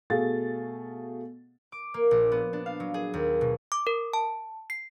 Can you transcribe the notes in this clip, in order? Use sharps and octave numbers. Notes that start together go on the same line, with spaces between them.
B2 A3 G#4 F5 A6
D6
A#3
A#1
B3
D4
F5
F#3
G#4
D#2
B2
D6
A#4
A5
C7